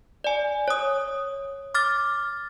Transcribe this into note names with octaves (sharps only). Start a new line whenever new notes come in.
D5 G#5
C#5 D#6
D6 F6 A6